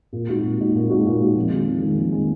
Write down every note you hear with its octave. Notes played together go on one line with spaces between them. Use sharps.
A#2
G#3 D#4 F#4
A#2
G#3 D#4 F#4
A#2
G#3 D#4 F#4
A#2
G#3 D#4 F#4
F2
D#3 G#3
F2
D#3 G#3
F2
D#3 G#3